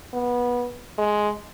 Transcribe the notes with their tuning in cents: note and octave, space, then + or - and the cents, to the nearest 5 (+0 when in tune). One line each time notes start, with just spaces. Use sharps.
B3 -20
G#3 +10